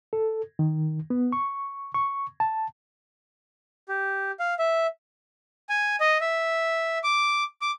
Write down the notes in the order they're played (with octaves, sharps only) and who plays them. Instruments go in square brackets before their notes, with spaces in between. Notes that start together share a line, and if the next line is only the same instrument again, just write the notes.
[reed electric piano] A4
D#3
B3
C#6
C#6
A5
[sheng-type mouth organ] G4
F5
E5
G#5
D#5
E5
D6
D6